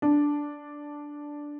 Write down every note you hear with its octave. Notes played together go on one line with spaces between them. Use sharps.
D4